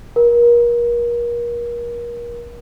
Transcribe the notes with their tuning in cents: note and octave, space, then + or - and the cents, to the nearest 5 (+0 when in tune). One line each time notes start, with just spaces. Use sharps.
A#4 +35